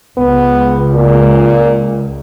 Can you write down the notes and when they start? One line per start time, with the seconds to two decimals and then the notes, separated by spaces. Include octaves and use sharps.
0.18 C#2 B3
0.94 A#2